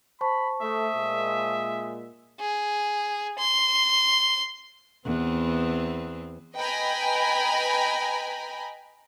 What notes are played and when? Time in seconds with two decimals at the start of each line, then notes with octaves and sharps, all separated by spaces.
0.21 C5 A5 B5 C#6
0.61 A3 E5 D#6
0.95 A#2 G#3
2.40 G#4
3.39 C6
5.05 E2 B3 C4
6.56 B4 D#5 G5 G#5 A#5 B5